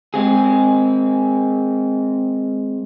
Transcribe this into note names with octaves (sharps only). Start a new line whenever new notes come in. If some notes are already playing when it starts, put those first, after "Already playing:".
G#3 C4 G#4